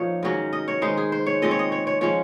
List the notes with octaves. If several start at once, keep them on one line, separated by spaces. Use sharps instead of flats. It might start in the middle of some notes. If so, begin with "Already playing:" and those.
Already playing: A#2 F3 D#4 C#5
G#2 D#3 F#3 C#4
D#5
C#5
D#3 G#3 D#4 C5
G#4
C5
C#5
A#2 G#3 C4 D#5
C#5
D#5
C#5
C#5
F3 G#3 C#4 C#5